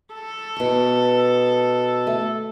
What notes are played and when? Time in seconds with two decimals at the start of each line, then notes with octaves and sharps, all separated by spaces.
0.13 A4
0.56 B2 C#6
2.07 A3